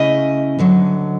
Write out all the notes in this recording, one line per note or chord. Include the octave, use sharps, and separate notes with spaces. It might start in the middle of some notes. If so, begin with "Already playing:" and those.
Already playing: C#3 A3 C#4 E4 D#5
D2 D3 F#3